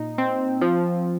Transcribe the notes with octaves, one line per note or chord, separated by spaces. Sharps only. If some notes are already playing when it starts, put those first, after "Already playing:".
Already playing: A#2 D#4
C4
F3